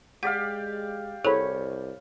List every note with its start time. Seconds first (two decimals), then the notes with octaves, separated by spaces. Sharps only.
0.23 G#3 G4 D5 F5 F#5
1.25 C2 E4 G#4 A4 C5 C#5 B5